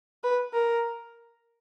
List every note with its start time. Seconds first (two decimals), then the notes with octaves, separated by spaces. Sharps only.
0.24 B4
0.54 A#4